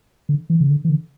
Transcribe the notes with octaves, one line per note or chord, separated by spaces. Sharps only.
D3
E3
C#3
D3
E3
D3